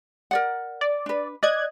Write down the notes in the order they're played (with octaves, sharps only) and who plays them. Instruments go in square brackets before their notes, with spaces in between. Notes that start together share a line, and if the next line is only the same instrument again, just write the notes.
[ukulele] A#4 D5 F#5
[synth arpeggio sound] D5
[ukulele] D4 B4
[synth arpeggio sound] D5 F#6 G#6 [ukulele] D#5